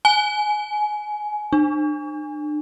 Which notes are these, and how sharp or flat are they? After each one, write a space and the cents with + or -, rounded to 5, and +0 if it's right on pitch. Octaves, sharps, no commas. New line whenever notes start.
G#5 +20
D4 +40